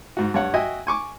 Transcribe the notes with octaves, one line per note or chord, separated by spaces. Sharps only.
G#2 F#4
G2 C#5 F#5
F#4 D#5 E5 G5 G#5
G#5 C#6 D6